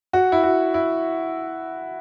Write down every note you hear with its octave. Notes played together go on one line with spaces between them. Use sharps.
F#4
E4
F#4
E4